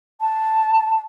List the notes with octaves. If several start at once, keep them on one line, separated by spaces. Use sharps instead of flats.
A5